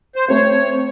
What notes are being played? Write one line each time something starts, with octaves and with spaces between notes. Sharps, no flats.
C5
A3 C4 C#5